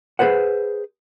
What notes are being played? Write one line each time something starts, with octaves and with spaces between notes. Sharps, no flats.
G#4 A4 B4 C5 F#5